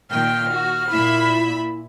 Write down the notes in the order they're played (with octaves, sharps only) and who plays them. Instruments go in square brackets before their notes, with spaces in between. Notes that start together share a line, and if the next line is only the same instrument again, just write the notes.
[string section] A#2 D#3 G5 [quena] F6
[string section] F#4
[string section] A#2 E5 B5 [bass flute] E4